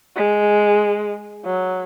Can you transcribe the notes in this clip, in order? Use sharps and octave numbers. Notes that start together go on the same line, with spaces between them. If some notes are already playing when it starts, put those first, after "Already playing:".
G#3
F#3